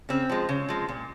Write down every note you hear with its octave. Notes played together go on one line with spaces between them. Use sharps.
C#3 C4
F3 G#3
C#3
F3 G#3
A#2